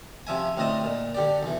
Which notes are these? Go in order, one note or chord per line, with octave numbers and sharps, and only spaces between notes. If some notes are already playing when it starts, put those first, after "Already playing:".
C3 F3 E5 G#5
D2 A2 C4 D#5 A5
A#2
D3 G4 D5
B1 E3